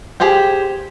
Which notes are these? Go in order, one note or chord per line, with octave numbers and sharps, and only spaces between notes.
G4 G#4 C5 G5